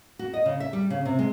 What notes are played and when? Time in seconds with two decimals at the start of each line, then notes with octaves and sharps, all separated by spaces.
0.19 F#4
0.34 D#5
0.46 C#3
0.60 E5
0.73 G3
0.90 C#3
1.05 C3
1.19 G#3